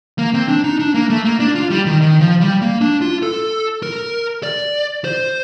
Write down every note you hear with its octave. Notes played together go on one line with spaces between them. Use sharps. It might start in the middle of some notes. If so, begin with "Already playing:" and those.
A#3
C4
D4
D#4
D4
A#3
A3
A#3
D4
F4
G3
D#3
D#3
F3
G3
A#3
D4
F4
A4
A#4
D5
C5